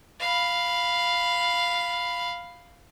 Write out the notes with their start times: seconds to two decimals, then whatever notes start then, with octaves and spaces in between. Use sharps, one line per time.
0.20 F5 B5